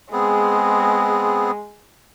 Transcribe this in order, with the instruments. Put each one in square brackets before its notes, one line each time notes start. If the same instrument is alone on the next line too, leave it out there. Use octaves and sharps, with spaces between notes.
[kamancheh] G#3 [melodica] B3 C4 G#4